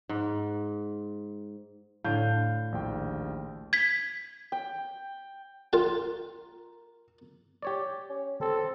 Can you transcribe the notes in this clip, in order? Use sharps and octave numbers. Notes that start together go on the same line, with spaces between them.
G#2
A2 D3 F5 G6
A#1 D#2 G5
G#6 B6
G5
F4 A#4 G5
G4 C#5 D5
C#4
C4 A4